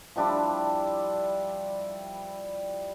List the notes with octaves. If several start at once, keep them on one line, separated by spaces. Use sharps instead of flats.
F3 G3 D4 E4